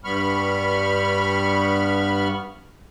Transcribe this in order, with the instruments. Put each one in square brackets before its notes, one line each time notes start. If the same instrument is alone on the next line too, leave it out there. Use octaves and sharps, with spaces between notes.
[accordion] G2 G3 B3 B5 C#6 F6